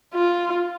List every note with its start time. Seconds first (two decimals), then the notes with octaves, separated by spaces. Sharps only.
0.15 F4